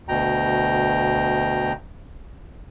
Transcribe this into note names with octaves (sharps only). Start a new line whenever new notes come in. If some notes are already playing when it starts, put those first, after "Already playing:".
D2 B2 G5 A#5